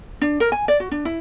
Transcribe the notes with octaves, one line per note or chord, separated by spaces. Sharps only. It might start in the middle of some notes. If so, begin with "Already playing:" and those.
D4
A#4
G#5
D5
F#4
D4
E4